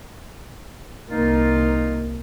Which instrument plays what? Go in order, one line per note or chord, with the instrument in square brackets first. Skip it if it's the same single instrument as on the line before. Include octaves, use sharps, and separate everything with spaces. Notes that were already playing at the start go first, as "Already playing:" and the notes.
[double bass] C2 A#3 [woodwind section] D#4 F4